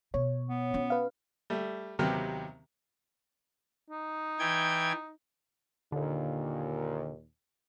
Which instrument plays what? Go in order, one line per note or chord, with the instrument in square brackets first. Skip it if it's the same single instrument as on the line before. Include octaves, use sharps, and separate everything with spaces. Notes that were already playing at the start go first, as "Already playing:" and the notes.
[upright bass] B2 [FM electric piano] C#5
[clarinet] B3
[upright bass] C#4 F4
[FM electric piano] B4 F5
[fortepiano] G3 A3
D#2 C3 F#3 B3 G4 F6
[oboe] D#4
[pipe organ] E3 G5 G#6
[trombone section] D#2 A#2 [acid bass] D3